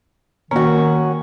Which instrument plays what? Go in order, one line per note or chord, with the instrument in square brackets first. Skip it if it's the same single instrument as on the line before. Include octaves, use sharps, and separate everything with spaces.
[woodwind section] D#3 [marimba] A#3 [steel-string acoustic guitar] C#4 F#4